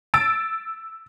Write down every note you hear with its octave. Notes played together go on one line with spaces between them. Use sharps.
E6 A6 D7